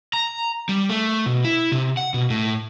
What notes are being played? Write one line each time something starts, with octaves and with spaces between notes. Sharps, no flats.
A#5
G3
A3
B2
E4
C3
F#5
B2
A2